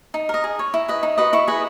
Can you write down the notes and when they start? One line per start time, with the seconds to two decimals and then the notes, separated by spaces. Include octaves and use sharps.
0.14 D#4
0.29 A#4 D#5
0.44 G#4
0.59 C#5
0.74 E4
0.88 B4 D#5
1.03 D#4
1.18 F#4 B4 D#5
1.33 E4 C#6
1.48 G#4 B4 D#5